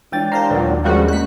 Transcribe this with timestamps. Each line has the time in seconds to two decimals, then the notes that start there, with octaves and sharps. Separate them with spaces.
0.12 E3 G#3 D4 F4 C#5 G5 A6
0.32 G4 A#4 C5 D5 F5 A#5
0.50 D#2 A#2 D#3 F#3 B4 C#5
0.84 F3 G3 G#3 C#4 F#4 A#4 C#5
1.08 A3 A#3 C#4 F#6 B6